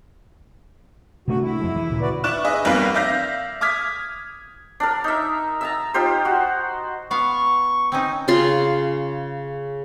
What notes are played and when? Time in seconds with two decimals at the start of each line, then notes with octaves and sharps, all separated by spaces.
1.28 C3 A3 D4 F#4
1.42 E4
1.60 F2 F3 G#3
1.76 E3
1.89 D2 A#2 C#3
2.01 F#4 B4 D5
2.24 E4 D5 C#6 D6 F#6 E7
2.45 G#4 B4 D#5 E5
2.65 B1 F2 G3 A#3 B4 F5
2.94 D5 E5 F5 G6 A#6
3.61 D6 D#6 F6 G#6 B6
4.80 D4 A#4
5.04 D#4 E5
5.61 E5 A5 A#5
5.94 D#4 F4 G4 C5
6.25 F#4
7.11 B3 F5 C#6
7.92 C4 C#4 D#4
8.28 C#3 F4 C6